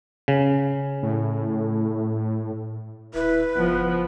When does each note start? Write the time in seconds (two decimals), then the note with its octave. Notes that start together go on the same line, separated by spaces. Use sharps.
0.28 C#3
1.03 A2
3.14 D#1 E4 B4
3.57 F#1 F3 B3